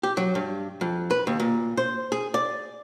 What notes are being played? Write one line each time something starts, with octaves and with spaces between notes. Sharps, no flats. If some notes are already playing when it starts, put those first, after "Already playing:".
G4
F#3
G2
F2
B4
D#2
A#2
C5
G#4
D5